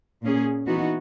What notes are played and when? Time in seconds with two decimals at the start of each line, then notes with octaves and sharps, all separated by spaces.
0.23 A#2 A#3 C#4 G#4
0.67 E3 B3 D#4 F#4